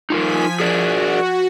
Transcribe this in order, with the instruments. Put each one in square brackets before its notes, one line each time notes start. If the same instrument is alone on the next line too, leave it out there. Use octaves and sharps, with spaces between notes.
[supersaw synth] F3 G#5 B6 [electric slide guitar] D#4 F4 A#4
[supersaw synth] F#4 [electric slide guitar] G#4 A#4 D5